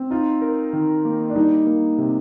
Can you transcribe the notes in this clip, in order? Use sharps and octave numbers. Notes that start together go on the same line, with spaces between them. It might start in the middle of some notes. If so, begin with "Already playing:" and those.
Already playing: C4
D#4 F4
A#4
D#3
A#3
D4
G3 D#4
A#3
C3